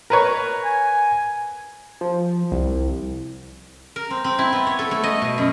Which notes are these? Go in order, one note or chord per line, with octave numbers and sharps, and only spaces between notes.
A#4 B4 C#5
G#5
F3
C2
A#4
C4
C4
E4
B3
C#5
A4
A3
D#5
B2
F#2